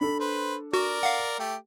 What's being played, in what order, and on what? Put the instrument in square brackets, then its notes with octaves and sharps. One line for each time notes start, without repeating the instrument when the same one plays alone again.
[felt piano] D4 A4 [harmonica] B5
[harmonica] B4 C5
[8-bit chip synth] F#4 [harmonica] A#4 D5
[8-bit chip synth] F5 F#5
[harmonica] A3 G4